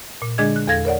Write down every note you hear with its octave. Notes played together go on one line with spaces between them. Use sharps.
A#2
D3 G#3 D4 G#4 D#5 G#6
F#6
E2 A4 F5 G#6 A#6
A#4 C#5 D5 F#5